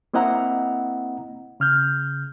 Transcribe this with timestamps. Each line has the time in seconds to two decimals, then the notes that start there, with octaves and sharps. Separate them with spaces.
0.14 A#3 C4 E4 D#5 F#5 A#5
1.60 C#3 F6 G6